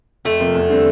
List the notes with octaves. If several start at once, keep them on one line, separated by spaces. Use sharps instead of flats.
F2 A3
C3 F3 A#3 F4
E2
D3 G3 C4